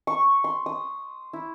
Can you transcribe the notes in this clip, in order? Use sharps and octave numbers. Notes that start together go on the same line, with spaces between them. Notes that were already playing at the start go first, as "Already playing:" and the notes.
C#6
C6
D#6
E4